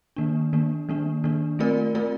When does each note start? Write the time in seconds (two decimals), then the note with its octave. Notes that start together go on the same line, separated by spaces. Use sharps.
0.16 D#3 A#3 D4
0.53 D#3 A#3 D4
0.89 D#3 A#3 D4
1.24 D#3 A#3 D4
1.59 A3 C4 F4 A#4 D5
1.95 A3 C4 F4 A#4 D5